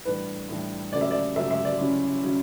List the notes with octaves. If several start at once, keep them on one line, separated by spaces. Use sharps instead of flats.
A2 E3 G3 D4 B4
A2 E3 G3 D4
C#3 F#3 A3 D5
E5
D5
C#3 F#3 A3 E5
E5
D5
C#3 F#3 C#4 E4
C#3 F#3 C#4 E4